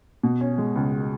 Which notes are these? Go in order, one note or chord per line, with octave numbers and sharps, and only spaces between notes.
B2
C#4
G#3
C#2